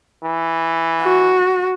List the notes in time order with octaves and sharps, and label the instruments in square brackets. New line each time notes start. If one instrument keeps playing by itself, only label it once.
[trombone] E3
[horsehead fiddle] F#4